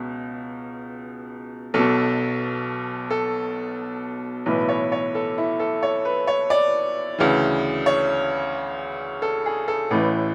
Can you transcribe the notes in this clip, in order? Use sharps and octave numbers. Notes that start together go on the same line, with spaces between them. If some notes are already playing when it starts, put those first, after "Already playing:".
Already playing: C#2 B2
B1 B2 A4
A4
B1 A2 E3 B4
C#5
C#5
A4
E4
A4
C#5
B4
C#5
D5
D2 C#3 E3
C#5
A4
G#4
A4
A1 A2 E3 B4